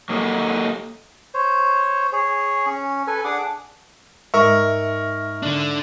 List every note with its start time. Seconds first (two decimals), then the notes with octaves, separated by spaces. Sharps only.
0.09 F#3 A#3 D#4 G4 A4
1.34 C5 C#5
2.12 G#4 C#5
2.66 C#4
3.07 A4 B4 G#5
3.24 D4 G#4 F#5 D6
4.34 G#2 A#4 E5 C#6
5.43 D3 D4